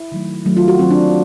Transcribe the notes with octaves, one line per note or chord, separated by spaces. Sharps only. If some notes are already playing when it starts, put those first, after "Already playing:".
Already playing: E4
D#3 F#3 A3
D#3 F#3 A3
F4
F#4
D#3 F#3 A3 C4
D4